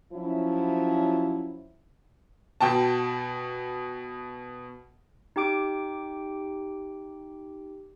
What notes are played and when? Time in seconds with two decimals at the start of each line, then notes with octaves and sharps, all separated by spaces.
0.13 F3 F#3 C#4 E4
2.61 B2 G5 A5
5.36 D#4 G4 G5 D6 D7